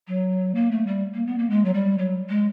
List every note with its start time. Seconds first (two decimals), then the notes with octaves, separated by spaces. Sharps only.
0.08 F#3
0.55 A#3
0.71 A3
0.87 G3
1.14 A#3
1.27 B3
1.38 A#3
1.50 G#3
1.65 F#3
1.74 G3
1.98 F#3
2.29 G#3